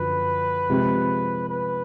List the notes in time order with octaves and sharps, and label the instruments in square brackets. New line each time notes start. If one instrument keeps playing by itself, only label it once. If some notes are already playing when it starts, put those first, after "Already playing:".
Already playing: [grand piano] F#2 D3 F3 [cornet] B4
[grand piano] C3 F3 G#3
[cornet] B4